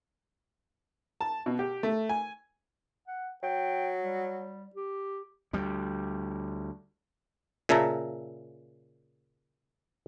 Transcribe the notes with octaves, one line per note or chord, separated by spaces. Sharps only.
A5
B2
G4
A3
G#5
F#5
F#3 G5
G3
G4
D2 G3
A#2 C#3 E5 A5 A#5